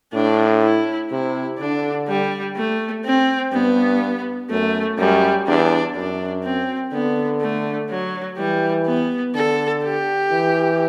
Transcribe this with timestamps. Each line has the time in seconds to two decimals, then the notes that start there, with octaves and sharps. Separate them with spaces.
0.13 A2 D4
0.61 E4
1.11 C3 E4
1.58 D3 D4
2.08 G3
2.56 A3
3.05 C4
3.52 G2 B3
4.49 F#2 A3
4.98 F#2 G3
5.47 E2 D4
5.96 F#2 D4
6.44 C4
6.92 D3 B3
7.41 A3
7.90 F#3
8.38 E3 G3
8.86 B3
9.34 D3 A4
9.84 G4
10.31 E3